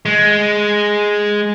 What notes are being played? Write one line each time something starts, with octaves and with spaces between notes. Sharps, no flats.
G#3